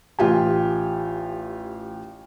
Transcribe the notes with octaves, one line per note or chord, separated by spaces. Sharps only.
A1 F4 G4 G#5